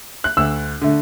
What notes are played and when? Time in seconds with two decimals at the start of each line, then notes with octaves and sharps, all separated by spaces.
0.24 F#6
0.37 D2 E6
0.81 D3 A3